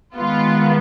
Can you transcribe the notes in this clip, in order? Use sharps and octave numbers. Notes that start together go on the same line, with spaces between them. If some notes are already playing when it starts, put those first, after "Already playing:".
D#3 G#3 B3 F4